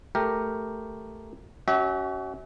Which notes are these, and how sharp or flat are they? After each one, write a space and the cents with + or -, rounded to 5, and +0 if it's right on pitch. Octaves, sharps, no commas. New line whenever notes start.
A3 +0 G4 +0 A#4 +0
C#4 +15 F#4 +35 E5 -30